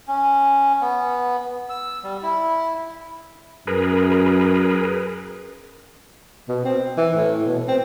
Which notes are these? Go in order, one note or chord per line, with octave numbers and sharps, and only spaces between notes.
C#4
B3
E6
G3
E4
F#2 G#4 A#4 B4
B2
C4
E3
A2
B2
C4